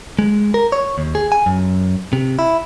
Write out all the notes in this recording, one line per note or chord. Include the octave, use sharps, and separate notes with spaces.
G#3
A#4
C#5
D#2
G#4
G#5
F#2
C3
E4